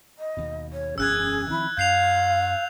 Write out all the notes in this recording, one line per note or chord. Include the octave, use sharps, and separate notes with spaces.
D#5
D#2 B2
C#5
E1 F#2 C#4 G#4 E6 F#6 G#6
D#3 F3 C4 E4
F#2 F5 G6 C7 F7